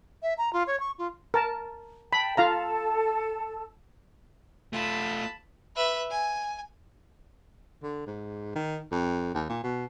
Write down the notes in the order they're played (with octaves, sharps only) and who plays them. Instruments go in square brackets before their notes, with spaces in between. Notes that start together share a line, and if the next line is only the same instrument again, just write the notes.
[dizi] E5
A#5
F4
C#5
C#6
F4
[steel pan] A#4 A5
[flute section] G5 A5 [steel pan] B5
[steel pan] F4 F5 A#5 [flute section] A4 A5
[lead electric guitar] A3 F4 [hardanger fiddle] A5 B5
[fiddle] B4 E5
G#5
[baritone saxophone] D3
G#2
D#3
F2
D#2
A#2
B2